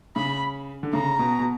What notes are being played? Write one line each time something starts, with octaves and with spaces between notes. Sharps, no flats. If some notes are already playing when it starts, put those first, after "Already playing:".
C#3 B5
D3
C#3 A#5
B2
B2